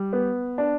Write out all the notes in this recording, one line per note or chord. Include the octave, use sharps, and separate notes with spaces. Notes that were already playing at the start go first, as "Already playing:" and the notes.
Already playing: G3
B3
D4